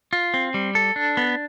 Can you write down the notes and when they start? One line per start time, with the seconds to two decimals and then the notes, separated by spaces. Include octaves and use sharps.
0.13 F4
0.34 C4
0.54 G3
0.75 A4
0.96 D4
1.17 B3